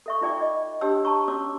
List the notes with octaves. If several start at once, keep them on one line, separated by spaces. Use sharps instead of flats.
A4 E5 C#6
D#4 F4 D5 G5 D6
D#5
D4 G4 C#5 G5 A5 E6
G4 A5 A#5 C#6
C#4 F#4 C#5 D6 E6